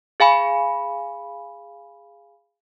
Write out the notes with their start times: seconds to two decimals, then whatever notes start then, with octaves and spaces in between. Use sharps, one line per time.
0.20 G#4 F5 G#5 B5